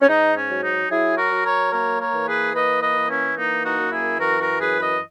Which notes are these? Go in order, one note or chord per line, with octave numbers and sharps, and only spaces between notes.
C#4
G#2 D#4
C#4
F#3
D#4
F#3 E4 G#4
F#4 A#4
F#3
A#4 C#5
A#3 A#4 C#5
A#4 C#5
E3
G#4 B4
A#3 B4 D#5
B4 D#5
E3
C#4 E4
A#3 D#4
D#4 F#4
F#2
E4 G#4
E3 F#4 A#4
F#4 A#4
F#2 G#4 B4
B4 D#5